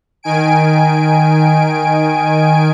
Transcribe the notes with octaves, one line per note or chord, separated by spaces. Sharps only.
D#3 G#5 D7